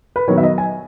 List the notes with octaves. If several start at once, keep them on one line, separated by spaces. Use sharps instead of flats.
B4
D#3 F#3 B3 C#5
E5
D#5
G#5